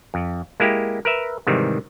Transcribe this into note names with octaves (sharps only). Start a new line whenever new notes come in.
F2
G#3 A#3 E4 G4
A#4 B4 E5
G#2 C3 D#3 E3 G3